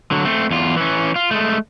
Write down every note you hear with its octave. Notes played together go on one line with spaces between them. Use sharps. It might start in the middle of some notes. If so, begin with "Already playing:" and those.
D3 F#3
A3 C4
E2 F4
E3 C#4
F4
G#3 A3